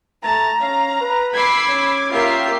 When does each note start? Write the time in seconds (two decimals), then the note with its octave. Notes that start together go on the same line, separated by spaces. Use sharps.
0.24 A3 A5 A#5
0.61 C#4 F5
1.01 B4
1.34 B5 D6 E6 G#6 C7
1.69 C#4
2.12 A#3 F4 G4 E5 C7